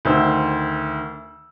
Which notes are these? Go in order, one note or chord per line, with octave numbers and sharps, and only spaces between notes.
D2 D#3 C5 E6